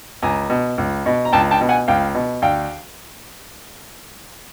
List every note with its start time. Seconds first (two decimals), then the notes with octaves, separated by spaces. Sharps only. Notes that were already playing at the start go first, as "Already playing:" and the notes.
0.22 C#2 G#5 A#5
0.50 B2
0.78 C#2
1.06 B2
1.25 A#5
1.33 C#2 G5 A5
1.51 G5 A5
1.61 B2
1.69 F#5 G#5
1.88 C#2 F5 G5
2.15 B2
2.42 D2 F5 G5